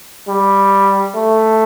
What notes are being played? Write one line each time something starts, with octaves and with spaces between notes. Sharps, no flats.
G3
A3